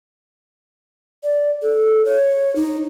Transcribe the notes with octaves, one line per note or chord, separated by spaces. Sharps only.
D5
A4
C#5
D#4